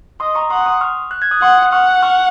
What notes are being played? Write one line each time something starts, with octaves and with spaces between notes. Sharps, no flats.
D#5 C6 D#6
A#5 C#6
F#5 C6 D#6
C6 D#6
C#6 F6
F#6
G#6
D#6 F#6
F#5 C6 D#6
F#6
F#5 C#6 F6
C#6 F6